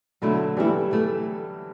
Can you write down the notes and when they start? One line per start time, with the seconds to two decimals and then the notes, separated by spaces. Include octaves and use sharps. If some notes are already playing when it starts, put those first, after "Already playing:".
0.22 B2 D3 F#3 A3 E4
0.57 B2 E3 G3 A3 E4
0.91 B2 A3 E4